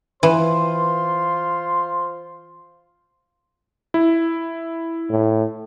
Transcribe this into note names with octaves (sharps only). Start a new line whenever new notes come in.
E3 F4 C5 C6
E4
A2